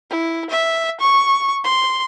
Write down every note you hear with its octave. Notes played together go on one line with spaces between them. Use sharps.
E4
E5
C#6
C6